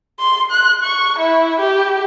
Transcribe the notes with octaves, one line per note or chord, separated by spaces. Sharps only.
C6
F#6
C#6
E4
G4